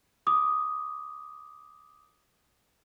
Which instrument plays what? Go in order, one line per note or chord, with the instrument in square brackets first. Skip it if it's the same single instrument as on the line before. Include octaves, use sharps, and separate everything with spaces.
[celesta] D6 D#6